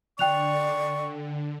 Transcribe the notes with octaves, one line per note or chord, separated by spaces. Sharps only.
D3 D5 G5 C#6 F#6 F7